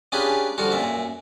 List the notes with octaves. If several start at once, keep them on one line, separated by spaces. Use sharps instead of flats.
C#4 D4 F4 G4 G#4 B4
D3 F3 G3 F4 F#4
F#2 A#2 E5